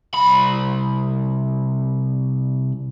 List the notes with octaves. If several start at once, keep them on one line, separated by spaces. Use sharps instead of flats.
C2 B5